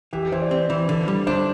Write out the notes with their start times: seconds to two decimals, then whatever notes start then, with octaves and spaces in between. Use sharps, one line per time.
0.13 E3 G4
0.23 G4
0.32 E3 C5
0.42 D5
0.51 C4
0.70 E3
0.89 D3
1.08 G3
1.27 D4 C5